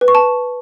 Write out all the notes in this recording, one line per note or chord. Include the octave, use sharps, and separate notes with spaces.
B4
C#6
A5